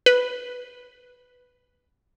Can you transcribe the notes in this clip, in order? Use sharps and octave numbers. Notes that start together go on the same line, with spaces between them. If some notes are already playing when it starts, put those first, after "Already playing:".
B4